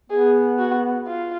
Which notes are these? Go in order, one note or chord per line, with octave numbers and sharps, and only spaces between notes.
B3 G#4
F#4
F4